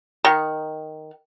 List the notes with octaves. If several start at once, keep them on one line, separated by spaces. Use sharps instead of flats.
D#3